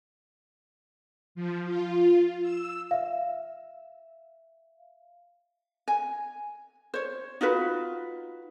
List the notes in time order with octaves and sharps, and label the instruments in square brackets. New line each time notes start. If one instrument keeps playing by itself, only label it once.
[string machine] F3
F4
E6
[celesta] E5 F5
[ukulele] G#5
C5 C#5
D#4 F4 F#4 B4